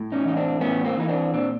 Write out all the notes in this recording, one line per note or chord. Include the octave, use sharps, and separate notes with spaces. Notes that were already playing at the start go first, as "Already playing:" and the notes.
Already playing: A2
C#4 D#4
E3 D#4
C4 D4
A2 B3 C#4
A#3 C4
E3 D#4
C4 D4
A#2 C4 D4